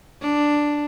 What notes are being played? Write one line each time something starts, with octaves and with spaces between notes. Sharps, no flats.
D4